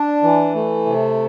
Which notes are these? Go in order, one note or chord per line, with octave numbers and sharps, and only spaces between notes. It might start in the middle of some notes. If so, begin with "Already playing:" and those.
Already playing: D4
E3
A3
C3